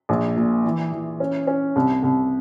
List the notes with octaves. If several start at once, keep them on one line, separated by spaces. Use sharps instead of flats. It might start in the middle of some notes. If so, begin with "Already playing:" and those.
A#1
A#2
E3
E3
C#4
C#4
C2
C2